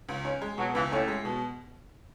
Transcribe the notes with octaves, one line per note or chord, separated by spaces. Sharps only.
C#2
C#4
G#3
B2 F#3
C#2 E3
A2 C#4
G#3
B2